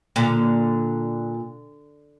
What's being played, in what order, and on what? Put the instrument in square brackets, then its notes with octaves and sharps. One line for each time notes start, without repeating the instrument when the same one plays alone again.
[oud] A#2 D3